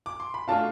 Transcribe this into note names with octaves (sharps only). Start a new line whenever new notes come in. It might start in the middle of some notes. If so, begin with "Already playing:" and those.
D6
C6
B5
B2 A3 D4 F4 F5 A5